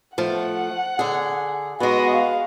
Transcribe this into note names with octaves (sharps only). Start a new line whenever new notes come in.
F3 A3 F#5
D3 G#4
G#3 B3 F#4 D#5
F5